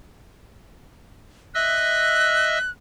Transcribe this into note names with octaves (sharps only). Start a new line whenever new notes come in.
D#5 E5 E6 F#6